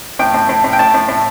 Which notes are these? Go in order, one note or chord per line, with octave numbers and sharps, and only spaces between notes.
A2 G5
A2
A2
A2
G5
A2 A5
A2
A2